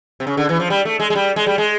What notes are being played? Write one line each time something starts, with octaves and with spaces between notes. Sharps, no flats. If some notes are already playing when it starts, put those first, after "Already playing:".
C3
C#3
D3
E3
F3
G3
A3
G#3
G#3
G3
G#3
G3
G#3